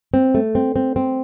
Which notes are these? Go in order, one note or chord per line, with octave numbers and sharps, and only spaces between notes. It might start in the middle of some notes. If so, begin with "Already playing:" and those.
C4
A3
C4
C4
C4